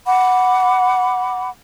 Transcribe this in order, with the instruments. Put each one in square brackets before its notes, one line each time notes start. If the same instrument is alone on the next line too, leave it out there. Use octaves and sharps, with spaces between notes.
[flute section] F#5 B5 D6